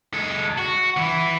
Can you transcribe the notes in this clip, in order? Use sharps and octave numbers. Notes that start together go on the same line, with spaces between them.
G#3 A4
F#4
E3 E4